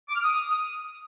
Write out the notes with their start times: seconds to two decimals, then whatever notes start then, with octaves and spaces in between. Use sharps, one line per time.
0.08 D6
0.15 F6
0.23 D#6